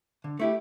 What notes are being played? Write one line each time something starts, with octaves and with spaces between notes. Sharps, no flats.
D3
A3 E4 G4